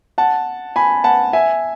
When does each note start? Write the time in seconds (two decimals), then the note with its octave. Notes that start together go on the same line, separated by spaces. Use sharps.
0.18 F#5 A5
0.76 G#5 B5
1.04 F#5 A5
1.33 E5 G#5